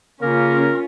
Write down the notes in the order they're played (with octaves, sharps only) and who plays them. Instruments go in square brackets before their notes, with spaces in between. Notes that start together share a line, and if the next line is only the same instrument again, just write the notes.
[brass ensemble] C#3 A#3 [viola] C#4 F4 [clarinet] A#4